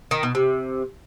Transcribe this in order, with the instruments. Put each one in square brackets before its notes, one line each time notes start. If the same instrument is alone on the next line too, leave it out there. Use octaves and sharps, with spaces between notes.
[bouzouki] D#3
B2
C3